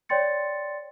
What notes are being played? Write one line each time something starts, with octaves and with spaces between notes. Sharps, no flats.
C#5 D5 G5 C6 A6 C#7